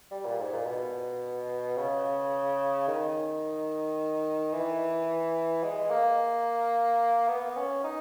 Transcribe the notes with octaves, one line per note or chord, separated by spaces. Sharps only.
G3
A#2
G#2
A#2
B2
C#3
D#3
E3
G#3
A#3
B3
C#4
D#4